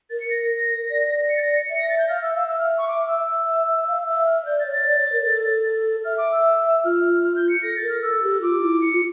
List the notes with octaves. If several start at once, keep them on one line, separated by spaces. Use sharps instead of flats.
A#4 A6
C#7
A#6
A#6
D5
C#7
A6
A#6
C#7
E5 C#7
A#6
A6
G6
F5 F6
E5 E6
F5 E6
E5 E6
F6
C#6
D6
E6
E5
E5
F5
E5 E6
F6
D5 G6
A6
C#5
A6
D5
C#5
A#4
A4
E5 F6
D6
E6
F4 F6
F6
G6
C#7
A4 A#6
A6
A#4
F6
A4 E6
G4
F4 D6
E4
E4 C#7
F4